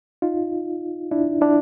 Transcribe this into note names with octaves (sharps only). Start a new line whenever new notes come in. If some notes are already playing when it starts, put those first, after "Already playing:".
D#4 F4
D4 E4
D4 E4